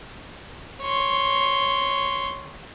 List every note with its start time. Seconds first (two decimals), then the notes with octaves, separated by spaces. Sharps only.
0.82 C#5 C6